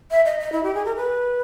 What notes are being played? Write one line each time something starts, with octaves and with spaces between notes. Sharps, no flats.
E5
D#5
D#5
E4
G4
G#4
A#4
B4